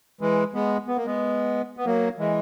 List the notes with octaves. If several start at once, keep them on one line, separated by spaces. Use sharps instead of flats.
E3 G#3
G#3 B3
B3
A#3
G#3 B3
B3
F#3 A#3
E3 G#3